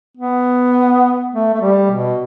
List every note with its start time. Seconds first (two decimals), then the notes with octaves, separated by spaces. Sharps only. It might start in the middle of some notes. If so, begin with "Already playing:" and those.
0.17 B3
1.33 A3
1.54 A3
1.61 G3
1.91 B2